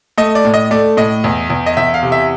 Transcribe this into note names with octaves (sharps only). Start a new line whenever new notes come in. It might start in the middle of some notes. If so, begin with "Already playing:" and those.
A3 D#5
D5
A2
D#5
A3 D5
A2 D#5
E2
E2
D#5
E2 E5
F5
C3
E5